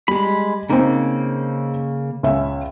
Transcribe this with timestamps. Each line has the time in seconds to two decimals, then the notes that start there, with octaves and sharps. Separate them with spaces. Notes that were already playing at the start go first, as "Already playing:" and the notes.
0.08 G3 G#3 B5
0.70 C#3 A#3 C4 D#4
2.23 C#2 C#4 E5